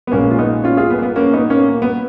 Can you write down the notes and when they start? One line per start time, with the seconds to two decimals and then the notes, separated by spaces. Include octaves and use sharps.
0.07 B3
0.12 A#1 A#2 G#3 A#3 C#4
0.31 F4
0.39 B3 D#4
0.64 C#4 F4
0.77 F4 G#4
0.90 B3
0.99 A#3
1.03 B3
1.16 A#3 C#4
1.33 B3 D#4
1.50 A#3 C#4
1.68 A#3
1.82 B3